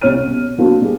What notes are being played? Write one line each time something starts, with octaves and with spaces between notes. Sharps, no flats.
C2 C#4 C#5 F6 D#7
B1
F#3 A#3 C4 D4 F#4
G3 G#4